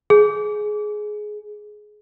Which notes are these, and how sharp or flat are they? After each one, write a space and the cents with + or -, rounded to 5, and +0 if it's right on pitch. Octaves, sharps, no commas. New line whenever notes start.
G#4 +15